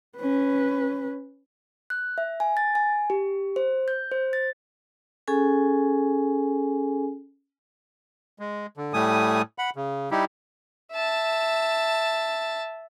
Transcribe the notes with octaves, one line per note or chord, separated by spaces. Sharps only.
C#4 B4
F#6
E5
G#5
A6
G#5
G4
C5
G6
C5
A6
C#4 G#4 A4 G#5
G#3
D3
A2 G3 A3 G#5 D#6
F#5 B5
C#3
G3 D#4 E4 G4
E5 A5